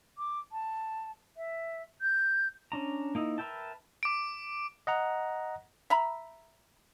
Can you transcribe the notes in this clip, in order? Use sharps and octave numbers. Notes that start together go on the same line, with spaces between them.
D6
A5
E5
G6
C#4 D4 A#5
A#3 D#4 E4
A#4 B4 E5 G5 A5
D6 D7
D#5 F#5 A#5
E5 A#5 B5